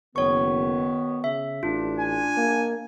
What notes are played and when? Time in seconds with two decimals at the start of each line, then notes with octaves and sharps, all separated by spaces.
0.16 F#1 B2 D#3 B3 C#5 C#6
1.24 C#3 E5
1.63 A1 D4 F4
1.99 G#5
2.37 A#3